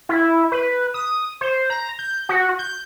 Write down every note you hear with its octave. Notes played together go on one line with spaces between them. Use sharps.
E4
B4
D#6
C5
A#5
G6
F#4
G6